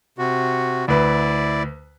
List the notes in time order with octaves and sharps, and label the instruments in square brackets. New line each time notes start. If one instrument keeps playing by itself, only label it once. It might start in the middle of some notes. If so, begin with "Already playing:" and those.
[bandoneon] C3 F#4
[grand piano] D2 B4 [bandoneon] E4 D5